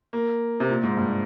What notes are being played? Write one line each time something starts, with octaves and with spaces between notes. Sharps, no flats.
A#3
C3
A#2
G#2
G2